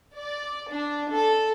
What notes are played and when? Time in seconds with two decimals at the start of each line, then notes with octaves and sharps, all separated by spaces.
0.16 D5
0.71 D4
1.13 A4